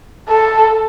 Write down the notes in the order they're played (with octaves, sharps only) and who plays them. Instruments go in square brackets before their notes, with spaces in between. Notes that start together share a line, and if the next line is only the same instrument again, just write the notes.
[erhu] A4